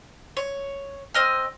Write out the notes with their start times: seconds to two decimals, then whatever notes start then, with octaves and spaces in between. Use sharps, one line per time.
0.37 C#5
1.14 C4 D#5 F6